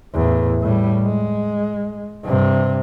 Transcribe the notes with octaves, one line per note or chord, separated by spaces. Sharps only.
E2 A2
A2 G3
G#3
G2 C3